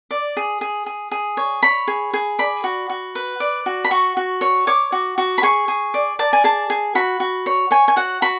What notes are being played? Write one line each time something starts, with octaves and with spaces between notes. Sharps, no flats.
D5
G#4
G#4
G#4
G#4
C#5
C#5 B5
G#4
G#4
D5 B5
F#4
F#4
B4
D5
F#4
B5
F#4 C#6
F#4
C#5
C#5 D6
F#4
F#4
B5
G#4 C#6
G#4
D5
D5 A5
G#5
G#4 A5
G#4
F#4 B5
F#4
C#5
C#5 G#5
G#5
F#4 F#5
F#4 B5